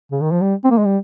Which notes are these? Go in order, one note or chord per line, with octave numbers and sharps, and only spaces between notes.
C#3
D#3
F3
G3
C4
A#3
G#3
G3